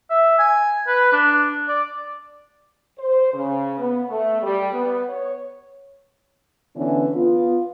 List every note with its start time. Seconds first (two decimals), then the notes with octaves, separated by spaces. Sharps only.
0.10 E5
0.39 G#5
0.87 B4
1.12 D4
1.68 D5
2.99 C5
3.34 C#3
3.78 B3
4.08 A3
4.41 G3
4.72 B3
5.08 C#5
6.76 D3 E3 B3 C#4 D4 E4
7.15 B3 F4